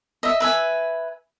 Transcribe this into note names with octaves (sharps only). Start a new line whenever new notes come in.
D#5 E5
B4 E5 G#5